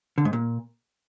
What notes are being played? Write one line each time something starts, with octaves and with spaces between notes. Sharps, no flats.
D3
G#2
A#2